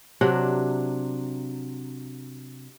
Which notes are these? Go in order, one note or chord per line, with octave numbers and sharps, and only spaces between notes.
C3 F#3 D4